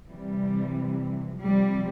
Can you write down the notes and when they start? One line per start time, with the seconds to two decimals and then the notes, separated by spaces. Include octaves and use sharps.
0.11 C3 E3 G3
1.43 C3 F3 G3